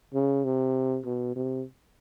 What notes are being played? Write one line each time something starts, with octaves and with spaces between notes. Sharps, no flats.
C#3
C3
B2
C3